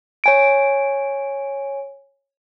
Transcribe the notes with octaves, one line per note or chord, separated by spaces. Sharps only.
C#5 G#5 D7